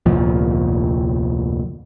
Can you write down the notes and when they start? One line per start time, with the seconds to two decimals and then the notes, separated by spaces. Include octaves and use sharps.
0.06 F1 D2 A#2 F3